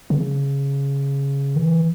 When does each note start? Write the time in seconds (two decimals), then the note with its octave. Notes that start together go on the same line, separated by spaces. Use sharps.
0.10 C#3
1.56 E3